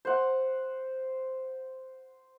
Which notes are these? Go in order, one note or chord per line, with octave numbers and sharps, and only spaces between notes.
C5 F#5